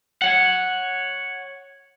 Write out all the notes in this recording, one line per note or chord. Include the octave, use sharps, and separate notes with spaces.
C#5 F#5